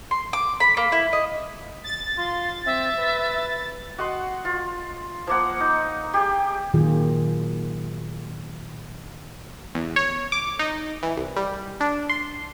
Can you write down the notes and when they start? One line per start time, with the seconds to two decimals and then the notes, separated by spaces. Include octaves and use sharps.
0.11 C6
0.33 D6
0.60 B5
0.77 A#3
0.92 E4
1.13 D#5
1.84 A6
2.17 F4 C6
2.66 C4 E5
2.98 B4
3.98 F#4 D#5 F#5 C6
4.45 F4
5.27 F3 A#3 F#5
5.60 D#4
6.14 G4 G#4
6.74 A#2 D#3 F#3 F4 G#4
9.75 E2
9.96 C#5
10.32 D6
10.59 D#4
11.03 E3
11.17 C2
11.36 G3
11.80 D4
12.09 C6